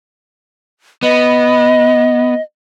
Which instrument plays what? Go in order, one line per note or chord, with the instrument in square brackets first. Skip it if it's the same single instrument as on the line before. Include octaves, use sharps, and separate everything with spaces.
[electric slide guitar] B3 [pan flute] D#5